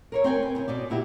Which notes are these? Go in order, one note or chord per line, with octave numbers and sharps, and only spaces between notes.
A#4 C5 C#5
C4 G5 G#5
B4
D#2 C#3
B2 B3 D5
A#2 E4 F#4 G4